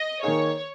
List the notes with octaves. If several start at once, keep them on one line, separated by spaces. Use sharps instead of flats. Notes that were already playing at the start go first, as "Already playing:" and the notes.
Already playing: D#5
D#3 A#3 D#4 G#4 C#5